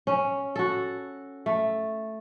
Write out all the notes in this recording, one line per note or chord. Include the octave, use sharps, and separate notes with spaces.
C#4
F#4 A4
A3